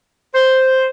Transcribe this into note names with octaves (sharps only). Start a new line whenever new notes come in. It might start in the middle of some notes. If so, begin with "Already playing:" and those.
C5